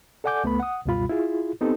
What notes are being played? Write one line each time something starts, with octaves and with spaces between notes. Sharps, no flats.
A4 D5 F#5 G#5 D6 G6
C#2 A3 B3 B4 B5
F#5 D#6
C#2 F#2 B2 G3 F4 B5
E4 F4 G#4
B3 C4 D#4 G4 A4